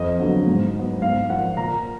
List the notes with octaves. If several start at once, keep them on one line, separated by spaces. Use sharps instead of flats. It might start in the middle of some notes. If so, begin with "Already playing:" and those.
Already playing: F2 D#5
D3 F#3 B3
G#2
F#3
B3
G#2 F5
F3 A#3 F#5
A#2 A#5